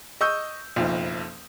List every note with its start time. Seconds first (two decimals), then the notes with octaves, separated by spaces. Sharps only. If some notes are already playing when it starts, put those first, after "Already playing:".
0.21 D#5 C#6 D#6 E6 G6
0.76 F#1 B1 F2